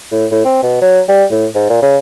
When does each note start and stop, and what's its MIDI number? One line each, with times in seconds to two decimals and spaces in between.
0.12 0.26 45
0.31 0.42 45
0.45 0.60 60
0.63 0.81 47
0.81 1.00 54
1.09 1.24 55
1.30 1.46 45
1.55 1.67 44
1.70 1.79 46
1.82 1.97 49